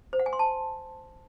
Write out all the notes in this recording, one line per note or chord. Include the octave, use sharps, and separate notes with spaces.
C5
F#5
G#5
C6
A5